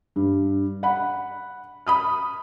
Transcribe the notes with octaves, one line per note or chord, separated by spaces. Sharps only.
G2
F#5 B5
B5 D#6 F6